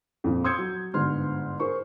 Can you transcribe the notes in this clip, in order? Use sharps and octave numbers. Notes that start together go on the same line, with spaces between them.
F2 A#2
C6 D#6 E6 G6 G#6 C#7
F#3
G1 G#2 C6 F6
G#4 A#4 C5 C#6